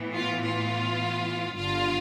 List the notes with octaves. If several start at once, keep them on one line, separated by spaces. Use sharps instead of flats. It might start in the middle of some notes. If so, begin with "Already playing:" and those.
Already playing: A2 E3 B3
F4
F4
G1 G2 D3 F4